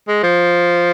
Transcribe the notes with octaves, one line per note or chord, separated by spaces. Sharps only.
G#3
F3